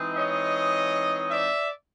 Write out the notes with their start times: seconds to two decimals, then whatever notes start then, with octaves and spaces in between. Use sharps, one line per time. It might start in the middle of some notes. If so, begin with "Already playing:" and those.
Already playing: E3 G#3 C4 D#4
0.18 C#5 D#5
1.31 D5 E5